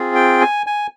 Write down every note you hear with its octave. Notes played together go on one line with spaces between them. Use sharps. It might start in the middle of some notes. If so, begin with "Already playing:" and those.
Already playing: C4 F4 G#4
G5
G#5
G#5